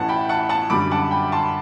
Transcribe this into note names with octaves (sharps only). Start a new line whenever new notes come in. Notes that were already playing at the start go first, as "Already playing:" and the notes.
Already playing: A1 A2 E3 F#5 A5
G5 B5
F#5 A5
F#5 A5
F#2 D3 G3 B5 D6
F#5 A5
G5 B5
A5 C6